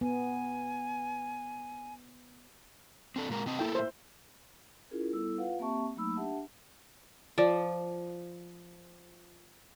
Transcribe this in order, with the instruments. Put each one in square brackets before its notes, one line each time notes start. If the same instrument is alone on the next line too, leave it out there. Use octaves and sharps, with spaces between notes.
[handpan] B3 [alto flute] G#5
[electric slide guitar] C4 D4 A4
A#2 G#3 A#4
C3 C4 D#5
[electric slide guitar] A2 A4 A#4 [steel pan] A#3 E4 G5
[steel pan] C5 E5
[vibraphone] C#4 E4 F4 G#4 A#4
G3 B3 E4 A4 E6
F4 B4 F5 F#5
A#3 C4 G4 E5 A5 C#6
F#3 A3 A#3 D#4 B5 E6
D4 G4 E5 F#5 A5
[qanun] F3 [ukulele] D5